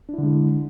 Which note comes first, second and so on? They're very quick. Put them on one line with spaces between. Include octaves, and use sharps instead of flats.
D4 E4 D3 G#3